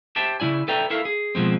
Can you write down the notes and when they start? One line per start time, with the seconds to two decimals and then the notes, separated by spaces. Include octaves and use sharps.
0.16 G4 C5 E5 G5 A5
0.40 C#3 F3 E4 D5 G#5
0.68 A4 B4 D5 E5 G5 A#5
0.90 E4 A4 A#4 E5 F5
1.05 G#4
1.35 B2 F3 G#3 C4